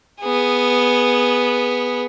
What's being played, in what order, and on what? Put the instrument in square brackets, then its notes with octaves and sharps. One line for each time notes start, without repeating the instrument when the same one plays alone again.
[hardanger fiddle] B3 G#4